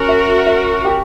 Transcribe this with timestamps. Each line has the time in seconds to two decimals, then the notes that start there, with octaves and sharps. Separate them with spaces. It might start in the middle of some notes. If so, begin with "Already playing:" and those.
Already playing: C#4 F#4 A#4
0.09 E5
0.47 E5
0.85 G4